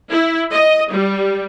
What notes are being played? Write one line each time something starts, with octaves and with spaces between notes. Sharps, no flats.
E4
D#5
G3